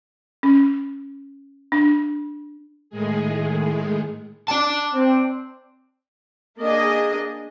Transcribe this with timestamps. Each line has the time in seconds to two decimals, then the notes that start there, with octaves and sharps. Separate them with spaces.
0.43 C#4
1.72 D4
2.90 A2 D#3 G#3 G#4
4.48 D5 A5
4.95 C4
6.60 A#3 D4 G#4 D#5